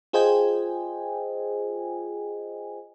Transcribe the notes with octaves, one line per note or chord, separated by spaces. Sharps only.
F4 G#4 C5 D#5 G5 G#5